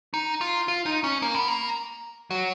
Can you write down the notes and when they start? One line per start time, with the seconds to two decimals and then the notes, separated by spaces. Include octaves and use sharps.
0.14 D#4
0.41 F4
0.68 F4
0.86 D#4
1.04 C#4
1.22 A#3
1.35 B3
1.48 A#3
2.31 F#3